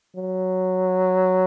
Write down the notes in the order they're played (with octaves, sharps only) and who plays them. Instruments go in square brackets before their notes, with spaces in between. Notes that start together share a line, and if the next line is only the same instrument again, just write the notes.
[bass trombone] F#3